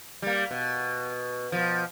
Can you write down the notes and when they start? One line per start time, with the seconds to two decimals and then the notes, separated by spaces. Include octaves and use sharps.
0.22 G3 A#3
0.51 B2
1.52 B2 F3